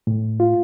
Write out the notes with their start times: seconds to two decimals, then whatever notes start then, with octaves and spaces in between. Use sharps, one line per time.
0.07 A2
0.40 F4